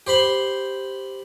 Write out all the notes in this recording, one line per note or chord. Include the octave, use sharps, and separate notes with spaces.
G4 C5 B5 C6